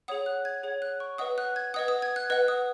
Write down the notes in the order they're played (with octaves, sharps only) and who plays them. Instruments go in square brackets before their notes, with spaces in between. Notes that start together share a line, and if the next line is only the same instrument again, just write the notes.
[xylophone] G#4 C#5 F#5 D#6
F#6
G#6
G#4 C#5 F#5
F#6
C#6
B4 D#5 F#5 D#6
F#6
G#6
B4 D#5 F#5 D#6
D#6
G#6
F#6
B4 D#5 F#5 F#6
D#6